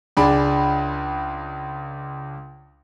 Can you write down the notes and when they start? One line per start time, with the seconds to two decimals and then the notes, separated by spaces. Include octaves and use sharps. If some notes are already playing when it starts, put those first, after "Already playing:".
0.17 C#2 D4 G#4 B5